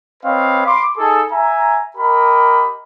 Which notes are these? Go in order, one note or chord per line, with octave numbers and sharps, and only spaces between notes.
C4 B4 C#5 D#5 F5
B5 C6 D6
D#4 G#4 A4
E5 G#5 A#5
G4 A#4 D#5 B5